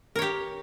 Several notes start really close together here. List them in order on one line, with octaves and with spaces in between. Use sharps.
A#4 C#5 G4